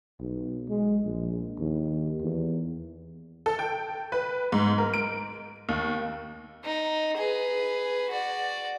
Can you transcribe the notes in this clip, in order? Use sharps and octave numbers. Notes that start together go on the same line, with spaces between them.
B1
G#3
A#1
D#2
E2
A4
G5
B4
G#2
A#4
D7
D#2
D#4
G#4 B4
F#4 D5